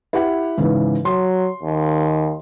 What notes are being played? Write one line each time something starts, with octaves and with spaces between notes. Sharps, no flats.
E4 G4 F#5
G#2 C#3 E3
F#3 C6
D#2